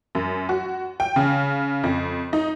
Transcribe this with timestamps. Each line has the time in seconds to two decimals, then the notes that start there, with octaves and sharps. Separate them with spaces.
0.15 F#2
0.49 F#4
1.00 G5
1.16 C#3
1.83 F2
2.33 D#4